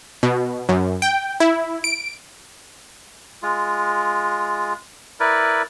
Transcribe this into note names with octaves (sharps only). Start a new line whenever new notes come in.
B2
F#2
G5
E4
D7
G#3 F4
E4 A#4 B4 D5